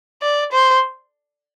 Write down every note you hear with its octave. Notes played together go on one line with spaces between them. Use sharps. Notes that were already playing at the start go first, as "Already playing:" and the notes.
D5
C5